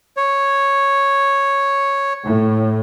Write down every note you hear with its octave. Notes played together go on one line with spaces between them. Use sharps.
C#5
A2